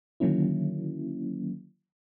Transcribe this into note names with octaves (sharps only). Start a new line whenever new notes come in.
D3 D#3 F#3 A#3 C#4 E4